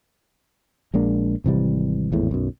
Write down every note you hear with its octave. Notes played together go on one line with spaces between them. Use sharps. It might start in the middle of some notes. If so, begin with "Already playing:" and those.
A#1 G#3 A#3 D4
G#1 C3 E3 G3
G#1 E2 A2
B1 F#2